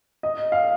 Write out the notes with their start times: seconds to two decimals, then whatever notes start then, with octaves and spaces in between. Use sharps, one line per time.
0.23 D#5
0.52 F5